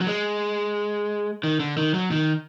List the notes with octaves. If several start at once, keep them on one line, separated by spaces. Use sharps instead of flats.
F#3
G#3
D#3
D3
D#3
F#3
D#3